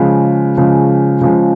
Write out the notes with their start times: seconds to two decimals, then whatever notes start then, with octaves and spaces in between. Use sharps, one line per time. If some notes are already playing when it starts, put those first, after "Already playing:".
Already playing: C#3 F3 G#3
0.57 C#3 F3 G#3
1.21 C#3 F3 G#3